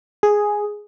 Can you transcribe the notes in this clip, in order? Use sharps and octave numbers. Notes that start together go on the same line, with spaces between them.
G#4